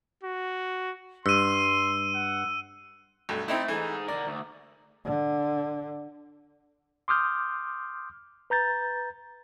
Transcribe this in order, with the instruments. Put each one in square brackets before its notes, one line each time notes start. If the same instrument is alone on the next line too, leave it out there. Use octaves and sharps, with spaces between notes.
[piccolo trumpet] F#4
[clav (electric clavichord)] G2 [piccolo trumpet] C6 [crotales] E6 D#7
[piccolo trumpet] F#5
[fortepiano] B1 G2 A3
[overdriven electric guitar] A3 [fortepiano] C4 D#4 E4
[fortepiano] E3 A3 [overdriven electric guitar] G#3 D#4
[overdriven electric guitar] D3 A#4 [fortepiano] D5
[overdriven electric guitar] D2
[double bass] D3
[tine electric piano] C6 D6 D#6 F6 G6
B4 A#5 G6 A6